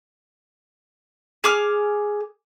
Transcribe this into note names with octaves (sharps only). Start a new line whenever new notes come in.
G#4 D6 F6